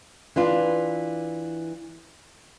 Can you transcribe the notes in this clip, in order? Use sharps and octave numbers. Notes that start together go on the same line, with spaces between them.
E3 D4 F4